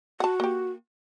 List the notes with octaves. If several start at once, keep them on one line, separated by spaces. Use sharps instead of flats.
F#4 F#5 A5
A#3 G4